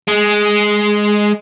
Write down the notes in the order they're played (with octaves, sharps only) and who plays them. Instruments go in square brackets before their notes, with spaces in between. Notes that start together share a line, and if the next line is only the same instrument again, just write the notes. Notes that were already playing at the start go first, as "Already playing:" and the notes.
[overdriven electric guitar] G#3